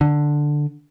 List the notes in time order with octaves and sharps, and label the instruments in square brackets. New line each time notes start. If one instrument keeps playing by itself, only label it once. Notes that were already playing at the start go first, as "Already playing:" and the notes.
[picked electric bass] D3